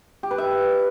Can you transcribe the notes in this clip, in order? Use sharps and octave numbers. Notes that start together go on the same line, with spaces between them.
G4
B4
E5